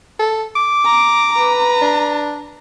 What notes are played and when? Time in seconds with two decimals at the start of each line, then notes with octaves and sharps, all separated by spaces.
0.19 A4
0.56 D6
0.85 A#5
1.33 B4 A#5
1.81 D4